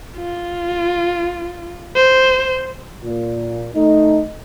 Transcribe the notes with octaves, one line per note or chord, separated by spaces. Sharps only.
F4
C5
A#2
A3 D#4